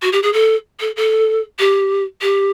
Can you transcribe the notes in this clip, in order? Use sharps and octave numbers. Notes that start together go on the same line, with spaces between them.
F#4
G4
G#4
A4
A4
A4
G4
G4